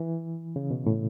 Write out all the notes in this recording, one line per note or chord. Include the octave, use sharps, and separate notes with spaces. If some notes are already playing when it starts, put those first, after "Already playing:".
Already playing: E3
C#3
B2
A2